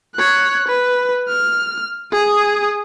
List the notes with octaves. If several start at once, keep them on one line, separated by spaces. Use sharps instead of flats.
C#5 F#6
B4
F6
G#4 D#6